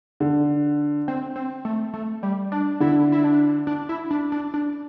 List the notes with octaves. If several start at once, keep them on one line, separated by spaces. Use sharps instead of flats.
D3
C4
C4
A3
A3
G3
D4
D3 E4
E4
D4
D4
E4
D4
D4
D4